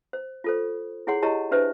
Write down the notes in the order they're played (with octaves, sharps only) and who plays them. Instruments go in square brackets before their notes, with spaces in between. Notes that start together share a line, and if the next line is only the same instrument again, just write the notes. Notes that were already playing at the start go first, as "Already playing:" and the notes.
[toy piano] C5
F4 A4 C5
E4 G#4 C#5 F#5 C6
E4 G4 C#5 D#5 A5 A#5
D4 G4 B4 C5 E5